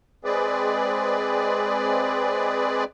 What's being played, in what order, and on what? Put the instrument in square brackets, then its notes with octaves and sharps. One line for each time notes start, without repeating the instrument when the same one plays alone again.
[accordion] G#3 C4 G#4 B4 D5